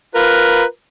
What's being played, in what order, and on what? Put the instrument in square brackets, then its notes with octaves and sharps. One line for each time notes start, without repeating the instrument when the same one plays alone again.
[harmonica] F4 A#4 B4